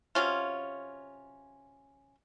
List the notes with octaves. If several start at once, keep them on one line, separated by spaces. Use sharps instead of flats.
C3 F#3 C#4 F4